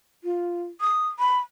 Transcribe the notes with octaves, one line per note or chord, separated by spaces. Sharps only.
F4
D#6
B5